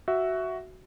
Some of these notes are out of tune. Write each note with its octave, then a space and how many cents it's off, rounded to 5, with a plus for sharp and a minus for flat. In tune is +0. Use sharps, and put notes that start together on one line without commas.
F#4 +10 E5 +0